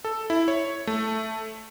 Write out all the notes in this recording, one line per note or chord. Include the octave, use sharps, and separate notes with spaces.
A4
E4
C#5
A3